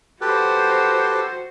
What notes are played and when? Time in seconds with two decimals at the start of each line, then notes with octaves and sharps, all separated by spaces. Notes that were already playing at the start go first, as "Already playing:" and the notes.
0.21 F#4 G4 A4 B4 C5